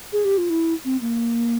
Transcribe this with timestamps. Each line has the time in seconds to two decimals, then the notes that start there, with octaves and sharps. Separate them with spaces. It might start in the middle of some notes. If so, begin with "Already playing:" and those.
0.13 G#4
0.25 G4
0.38 F4
0.50 E4
0.85 C4
1.01 A#3